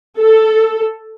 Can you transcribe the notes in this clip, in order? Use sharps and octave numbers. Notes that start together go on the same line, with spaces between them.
A4